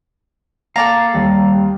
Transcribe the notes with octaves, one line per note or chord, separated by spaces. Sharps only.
A#3 A4 D5 F5 A#5
D#2 G3